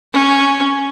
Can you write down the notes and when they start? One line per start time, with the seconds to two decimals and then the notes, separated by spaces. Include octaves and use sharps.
0.13 C#4